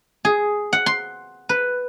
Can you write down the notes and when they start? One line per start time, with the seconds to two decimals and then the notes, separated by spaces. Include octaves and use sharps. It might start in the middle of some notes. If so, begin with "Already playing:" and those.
0.25 G#4
0.73 F#5
0.86 C6
1.49 B4